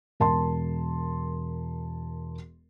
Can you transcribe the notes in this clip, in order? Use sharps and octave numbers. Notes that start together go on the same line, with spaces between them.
E1 A#4 A5 C6